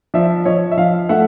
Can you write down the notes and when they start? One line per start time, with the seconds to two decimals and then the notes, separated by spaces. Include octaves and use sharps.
0.14 F3 D5 E5
0.45 F3 C#5 D#5
0.71 E5
0.77 F3 D#5 F5
1.09 A3 E5 F#5